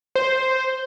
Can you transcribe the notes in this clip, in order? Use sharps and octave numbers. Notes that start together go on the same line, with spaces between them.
C5